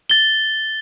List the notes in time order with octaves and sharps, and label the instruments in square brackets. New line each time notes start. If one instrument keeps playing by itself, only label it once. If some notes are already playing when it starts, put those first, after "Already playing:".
[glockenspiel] A6 G7